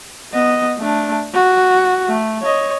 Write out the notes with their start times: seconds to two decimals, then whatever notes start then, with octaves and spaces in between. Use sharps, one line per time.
0.32 B3 D#5
0.78 A3 D4
1.34 F#4
2.08 A3
2.42 C#5 D#5